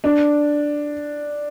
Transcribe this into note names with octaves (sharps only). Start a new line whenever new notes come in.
D4